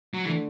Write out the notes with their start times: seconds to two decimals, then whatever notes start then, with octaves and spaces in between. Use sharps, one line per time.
0.14 F#3
0.25 D3 E3 A3 D4 A4